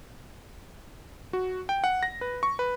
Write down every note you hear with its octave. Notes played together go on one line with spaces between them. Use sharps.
F#4
G5
F#5
A#6
B4
C#6
B4